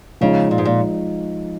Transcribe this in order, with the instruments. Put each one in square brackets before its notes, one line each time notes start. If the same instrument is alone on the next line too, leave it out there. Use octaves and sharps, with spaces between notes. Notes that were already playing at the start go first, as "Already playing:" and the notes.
[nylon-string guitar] C#3 [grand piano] F3 G#3 D#4
[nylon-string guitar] A#2
G#2
A#2